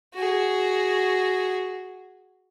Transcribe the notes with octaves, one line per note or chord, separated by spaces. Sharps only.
F#4 G#4